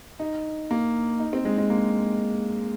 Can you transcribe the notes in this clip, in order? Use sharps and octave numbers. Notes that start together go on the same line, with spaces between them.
D#4
A#3
D#4
C4
G#3
G#3
A#3